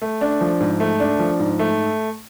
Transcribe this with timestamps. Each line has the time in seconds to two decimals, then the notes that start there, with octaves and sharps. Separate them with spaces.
0.02 A3
0.21 D4
0.41 F3
0.60 G#2
0.80 A3
1.00 D4
1.19 F3
1.40 G#2
1.59 A3